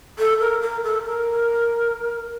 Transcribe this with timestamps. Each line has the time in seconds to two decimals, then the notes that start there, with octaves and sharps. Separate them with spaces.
0.18 A4
0.40 A#4
0.61 A#4
0.84 A4
1.04 A#4